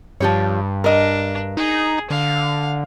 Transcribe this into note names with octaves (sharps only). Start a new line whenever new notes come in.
G2 F3 G4 C#5
D4 A#4 D#5
D#4 G#4
D3 F5